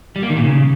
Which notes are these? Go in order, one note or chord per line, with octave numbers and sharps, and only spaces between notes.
G3
A#3
D#3
A#2
C#3